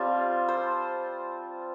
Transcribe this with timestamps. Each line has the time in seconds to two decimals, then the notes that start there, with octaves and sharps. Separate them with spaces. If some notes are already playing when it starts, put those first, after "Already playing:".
Already playing: G3 C4 F4 A5
0.49 C5